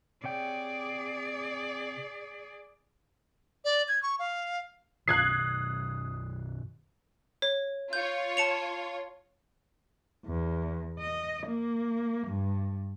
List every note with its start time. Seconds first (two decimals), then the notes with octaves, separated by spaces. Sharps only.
0.24 C3 G#4 C#5 D5 G5
3.65 D5
3.88 G#6
4.03 C#6
4.19 F5
5.08 F#2 B2 D#3 D#6 F#6 G#6 C7
7.42 C#5
7.93 F4 C#5 G6
8.37 A5 C#7 F7
10.26 E2
11.00 D#5
11.47 A#3
12.27 G2